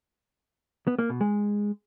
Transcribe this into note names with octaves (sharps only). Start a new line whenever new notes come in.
B3
A#3
B2
G#3